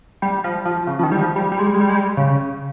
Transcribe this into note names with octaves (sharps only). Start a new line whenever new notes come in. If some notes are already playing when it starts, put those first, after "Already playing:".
G3
F3
F3
C#3
F3
D#3
G3
F3
G3
G3
G#3
G3
G#3
G3
G#3
G3
C#3